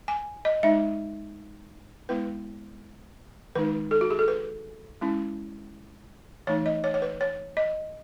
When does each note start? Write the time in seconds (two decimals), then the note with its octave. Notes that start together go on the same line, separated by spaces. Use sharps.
0.08 G#5
0.45 D#5
0.63 G#3 D#4 E5
2.09 G#3 B3 E4 B4
3.55 D#3 G#3 D#4 B4
3.91 A4
4.01 F#4
4.11 G#4
4.19 A4
4.28 B4
5.01 G#3 C#4 E4
6.47 E3 A3 D#4 C#5
6.66 D#5
6.84 C#5
6.94 C#5
7.02 B4
7.21 C#5
7.57 D#5